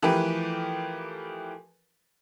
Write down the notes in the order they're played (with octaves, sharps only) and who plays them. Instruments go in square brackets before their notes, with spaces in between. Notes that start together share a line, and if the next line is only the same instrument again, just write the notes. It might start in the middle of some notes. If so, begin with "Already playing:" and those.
[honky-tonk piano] E3 F3 A3 G4 A#4 B4